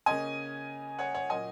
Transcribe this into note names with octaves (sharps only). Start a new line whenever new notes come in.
C#3 A#3 C#4 D#5 G#5
C#5 F#5
C#5 F#5
A#2 F#3 A#3 C#4 D#5 G#5